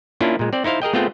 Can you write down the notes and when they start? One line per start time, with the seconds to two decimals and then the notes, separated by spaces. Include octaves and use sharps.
0.20 A#3 C#4 D4 E4 F4
0.39 A#2 G#3
0.53 C4 D5
0.64 D#4 E4 C5 F5
0.82 G#4 A#4 D#5 G5
0.93 A3 B3 C4 F4 G#4 G5